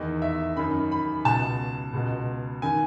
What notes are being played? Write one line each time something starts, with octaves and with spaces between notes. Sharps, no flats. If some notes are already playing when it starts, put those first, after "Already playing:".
Already playing: E2 D#3 D#5
E5
F#2 D#3 B5
B5
C#2 B2 A5
C#2 B2
D#3 G#5